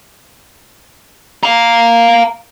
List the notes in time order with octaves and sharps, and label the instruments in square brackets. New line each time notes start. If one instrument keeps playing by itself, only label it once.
[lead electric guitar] F5 A#5